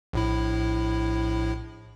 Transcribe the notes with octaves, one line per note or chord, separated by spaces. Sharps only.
A#1 A2 E4